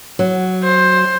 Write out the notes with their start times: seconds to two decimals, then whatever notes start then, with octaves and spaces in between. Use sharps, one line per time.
0.19 F#3
0.64 C5